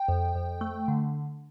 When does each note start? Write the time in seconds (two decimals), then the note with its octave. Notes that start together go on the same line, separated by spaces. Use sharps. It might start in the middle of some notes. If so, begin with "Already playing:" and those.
Already playing: G5
0.08 F2
0.35 F2
0.61 A3
0.88 D3